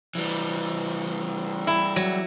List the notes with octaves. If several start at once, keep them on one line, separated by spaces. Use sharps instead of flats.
E3 G3
E4
F#3